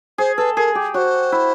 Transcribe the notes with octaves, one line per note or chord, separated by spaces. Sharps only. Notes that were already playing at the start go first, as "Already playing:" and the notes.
G#4 C5
A4 B4
G#4 A#4
G4
F#4 C5 C#5
E4